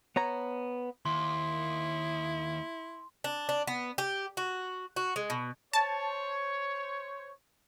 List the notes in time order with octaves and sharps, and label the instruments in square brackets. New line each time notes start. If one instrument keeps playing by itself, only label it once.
[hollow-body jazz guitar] B3 C#5 A#5
[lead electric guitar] D#2 [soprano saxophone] E4 [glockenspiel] C6
[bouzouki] D4
D4
B3
G4
F#4
F#4
G#3
B2
[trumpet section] C5 C#5 [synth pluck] A5